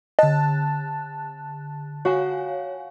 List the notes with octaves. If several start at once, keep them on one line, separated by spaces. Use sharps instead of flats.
D3 D#5 A5 F#6
F#4 C#5 F5 G#5